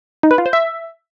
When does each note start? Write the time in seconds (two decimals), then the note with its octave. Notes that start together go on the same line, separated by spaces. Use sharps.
0.23 D#4
0.31 B4
0.38 F4
0.46 C5
0.53 E5